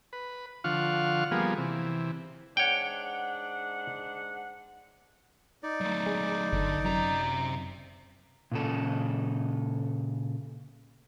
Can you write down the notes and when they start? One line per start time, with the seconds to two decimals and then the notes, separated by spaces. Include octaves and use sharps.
0.13 B4
0.64 D3 F3 F4 F5 F#5 C#6
1.31 F3 G3 A#3 B3 G#4
1.57 C3 E3
2.57 G#2 D4 C#5 F#5 G5
5.63 D#4 D5
5.81 F#3 A3
6.06 G#3
6.52 G1 D3
6.85 F#2 C3 A#5
8.52 A#2 C#3 A4